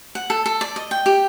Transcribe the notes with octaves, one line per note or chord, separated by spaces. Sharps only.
F#5
A4
A4
D5
D#5
G5
G4